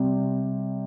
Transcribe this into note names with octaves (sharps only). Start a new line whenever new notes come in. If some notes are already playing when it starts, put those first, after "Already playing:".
Already playing: C3 G3